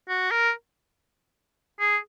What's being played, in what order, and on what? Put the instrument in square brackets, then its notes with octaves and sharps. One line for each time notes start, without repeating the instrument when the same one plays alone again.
[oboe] F#4
A#4
G#4